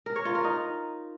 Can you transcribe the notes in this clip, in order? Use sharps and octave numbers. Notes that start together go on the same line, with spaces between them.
A#4
C#5
F4
A#4
D#4